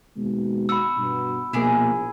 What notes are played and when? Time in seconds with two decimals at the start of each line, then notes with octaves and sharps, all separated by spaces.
0.17 D#2 B2 G#3
0.69 F#4 B5 E6
0.97 G2 B2
1.53 A#1 B2 A#3 E4 G#4 D6